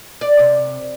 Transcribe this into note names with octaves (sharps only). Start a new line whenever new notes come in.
D5
C3